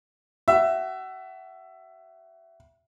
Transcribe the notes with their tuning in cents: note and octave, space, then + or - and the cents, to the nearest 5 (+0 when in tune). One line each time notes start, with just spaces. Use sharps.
F#4 +30 E5 +15